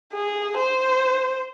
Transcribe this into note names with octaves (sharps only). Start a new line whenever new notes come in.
G#4
C5